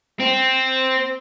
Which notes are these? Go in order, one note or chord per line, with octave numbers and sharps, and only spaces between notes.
C4